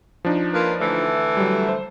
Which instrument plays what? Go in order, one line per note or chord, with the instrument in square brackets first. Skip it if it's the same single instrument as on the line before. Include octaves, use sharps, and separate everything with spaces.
[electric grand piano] F3 D4 D#4
[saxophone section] A#3 F4 B4
D3 E3 A3
[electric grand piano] F#3 G3
C5